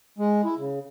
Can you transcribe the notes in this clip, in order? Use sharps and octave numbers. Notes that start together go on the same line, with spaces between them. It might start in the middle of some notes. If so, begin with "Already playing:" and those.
G#3
E4
C#3